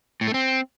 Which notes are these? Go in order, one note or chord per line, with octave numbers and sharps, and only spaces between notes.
A2
A3
C4